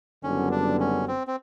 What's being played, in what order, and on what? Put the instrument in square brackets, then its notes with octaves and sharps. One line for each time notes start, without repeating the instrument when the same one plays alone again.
[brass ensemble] F#1 F#2 D3 G3 B3 [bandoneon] C#4
[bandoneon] D4
C#4
C4
C4